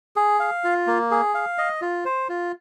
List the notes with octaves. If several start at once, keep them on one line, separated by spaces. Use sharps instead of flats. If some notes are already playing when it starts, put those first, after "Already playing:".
G#4
F5
F4
A#3
G#4
F5
D#5
F4
C5
F4